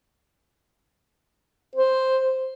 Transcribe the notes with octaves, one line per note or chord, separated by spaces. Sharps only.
C5